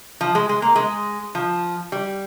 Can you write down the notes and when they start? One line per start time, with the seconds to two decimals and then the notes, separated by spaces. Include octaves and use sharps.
0.21 F3
0.35 G#3
0.49 G#3
0.62 A#3
0.76 G#3
1.35 F3
1.92 G3